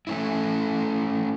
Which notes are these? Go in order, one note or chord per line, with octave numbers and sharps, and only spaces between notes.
A3 C#4 E4